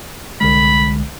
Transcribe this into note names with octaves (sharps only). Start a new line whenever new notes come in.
C2 D3 G#3 B5